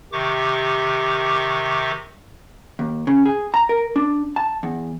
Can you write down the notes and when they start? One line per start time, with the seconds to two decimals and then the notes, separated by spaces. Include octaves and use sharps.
0.12 C3 D#3 G4 C#6 D6
2.79 D#2
3.07 C#3
3.26 G#4
3.54 A#5
3.69 A#4
3.96 D4
4.36 A5
4.63 E2